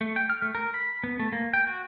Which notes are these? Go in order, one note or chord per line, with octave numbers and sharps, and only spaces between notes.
A3
G5
F6
A3
A#4
B5
B3
A3
A#3
G5
F#4